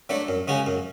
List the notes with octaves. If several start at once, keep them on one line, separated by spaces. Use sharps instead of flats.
F#3 A3 D4 A4
F#2
C#3 G#3 C#4 F#4
F#2